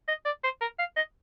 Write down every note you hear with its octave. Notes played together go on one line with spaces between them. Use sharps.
D#5
D5
C5
A#4
F5
D#5